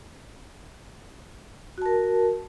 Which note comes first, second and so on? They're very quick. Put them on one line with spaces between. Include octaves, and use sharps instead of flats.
F#4 A5 A#4